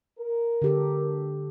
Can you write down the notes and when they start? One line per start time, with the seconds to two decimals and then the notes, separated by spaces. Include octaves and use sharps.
0.19 A#4
0.62 D3 G4 A4